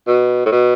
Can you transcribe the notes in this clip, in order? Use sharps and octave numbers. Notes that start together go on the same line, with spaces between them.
B2
A2
B2